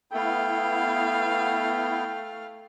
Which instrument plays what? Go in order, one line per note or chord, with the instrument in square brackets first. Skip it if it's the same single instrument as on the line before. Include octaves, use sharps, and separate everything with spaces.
[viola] A3 F5 [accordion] B3 E4 [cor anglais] G5